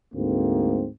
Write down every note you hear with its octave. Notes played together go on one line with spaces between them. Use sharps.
D2 G#2 A3 A#3 C4